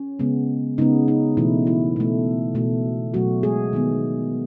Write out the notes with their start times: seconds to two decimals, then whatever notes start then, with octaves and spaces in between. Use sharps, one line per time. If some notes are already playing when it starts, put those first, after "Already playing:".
Already playing: C#4
0.19 C#3 G#3 B3
0.78 C#3 G#3 B3 D#4
1.08 D#4
1.37 B2 E3 A3 E4
1.67 E3 E4
1.96 B2 A3
2.55 B2 A3
3.14 B2 F#3 A3 F#4
3.43 G#3 G#4
3.73 D#3 G#3 B3